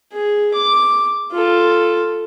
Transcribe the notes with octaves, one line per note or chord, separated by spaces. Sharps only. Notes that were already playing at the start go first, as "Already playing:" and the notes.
G#4
D6
F4 A4